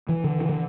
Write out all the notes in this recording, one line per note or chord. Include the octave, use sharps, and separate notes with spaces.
E3
D3
E3
D3